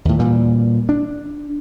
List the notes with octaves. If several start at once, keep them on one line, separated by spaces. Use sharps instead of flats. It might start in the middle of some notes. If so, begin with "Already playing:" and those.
D#2 A2
A#2 E3 G3
D4